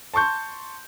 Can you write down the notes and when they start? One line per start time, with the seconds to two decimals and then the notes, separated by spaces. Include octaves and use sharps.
0.14 A5 C6 C#6 G6